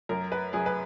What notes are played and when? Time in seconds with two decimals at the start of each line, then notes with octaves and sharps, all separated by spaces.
0.09 F#2 A#4
0.32 B4
0.53 F#2 G#4
0.66 B4